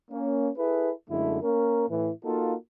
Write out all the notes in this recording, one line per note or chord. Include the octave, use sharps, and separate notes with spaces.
A#3 C#4
E4 G#4 A4 B4
F#2 D3 G#3 A3 E4
A#3 C#4 A#4
A2 E3
A#3 D#4 F4 F#4 A4